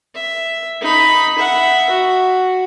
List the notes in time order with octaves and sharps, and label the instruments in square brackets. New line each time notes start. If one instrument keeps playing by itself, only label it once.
[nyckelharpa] E5
D#4 B5
E5 F#5
F#4